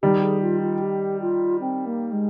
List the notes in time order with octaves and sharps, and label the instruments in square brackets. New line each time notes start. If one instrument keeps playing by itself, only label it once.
[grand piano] D#3 G3 [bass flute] G4
[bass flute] G#4
F4
F4
G4
F4
C4
A#3
G#3